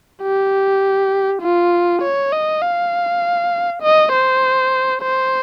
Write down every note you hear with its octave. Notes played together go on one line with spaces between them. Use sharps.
G4
F4
C#5
D#5
F5
D#5
C5
C5